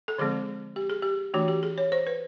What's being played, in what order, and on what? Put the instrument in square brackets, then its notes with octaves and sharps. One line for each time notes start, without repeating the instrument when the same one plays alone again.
[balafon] A4
D3 F3 G#3 C4 G#4
G4
G#4
G4
E3 A3 D4 F#4
G4
G#4
C#5
C5
B4